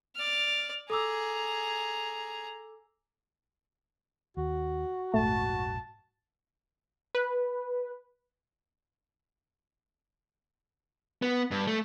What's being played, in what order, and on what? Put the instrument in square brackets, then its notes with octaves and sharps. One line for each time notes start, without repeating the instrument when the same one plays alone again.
[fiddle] D5 F6
[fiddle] G#4 A#5 [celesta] A4 D6 E6
[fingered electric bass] D#2 [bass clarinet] F#4
[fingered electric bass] F1 A#1 G#2 [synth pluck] A3 [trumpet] A5
[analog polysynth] B4
[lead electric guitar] B3
G2
A3